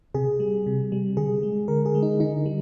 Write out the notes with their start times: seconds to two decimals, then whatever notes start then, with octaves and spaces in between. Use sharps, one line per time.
0.15 C3 G#4
0.40 G3
0.66 C3
0.92 G3
1.17 D3 G#4
1.43 G#3
1.68 D3 A#4
1.85 G#4
1.95 G#3
2.03 D#4
2.20 D3 D#4
2.46 G3